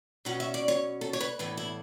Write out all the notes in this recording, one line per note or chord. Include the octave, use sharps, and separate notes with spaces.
B2 F#3 C#4 F#5
E5
D5
C#5
A4
C#5
B4
A2 E3 B3 B4
E4